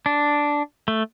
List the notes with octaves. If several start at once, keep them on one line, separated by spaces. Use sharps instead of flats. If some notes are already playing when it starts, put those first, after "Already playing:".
D4
A3